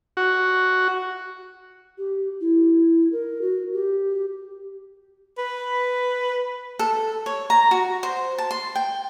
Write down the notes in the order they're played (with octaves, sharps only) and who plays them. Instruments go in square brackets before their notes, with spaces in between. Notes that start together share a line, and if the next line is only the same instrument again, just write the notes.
[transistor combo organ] F#4
[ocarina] G4
E4
A#4
F#4
G4
[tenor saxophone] B4
[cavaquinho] A4
C#5
A#5
F#4
C5
A5
C6
G5